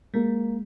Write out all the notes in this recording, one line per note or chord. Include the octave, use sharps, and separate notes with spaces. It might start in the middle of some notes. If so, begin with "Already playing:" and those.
G#3 A#3